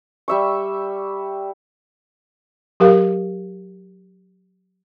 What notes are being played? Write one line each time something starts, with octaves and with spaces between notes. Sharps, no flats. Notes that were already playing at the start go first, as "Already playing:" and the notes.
G3 E5 C#6
F#3 G4 A#4 F5